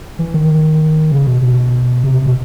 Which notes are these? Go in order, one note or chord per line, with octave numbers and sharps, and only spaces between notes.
E3
D#3
C#3
B2
B2
C3
B2